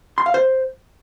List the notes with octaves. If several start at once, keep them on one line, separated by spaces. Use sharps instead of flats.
C6
F5
C5